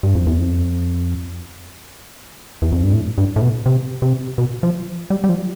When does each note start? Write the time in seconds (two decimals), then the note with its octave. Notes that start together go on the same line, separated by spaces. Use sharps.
0.03 G2
0.15 F2
0.27 E2
0.38 F2
2.62 E2
2.72 F2
2.83 G2
2.93 A2
3.18 G2
3.36 A2
3.42 B2
3.66 C3
4.02 C3
4.38 B2
4.63 F3
5.10 G3
5.24 G3
5.29 F3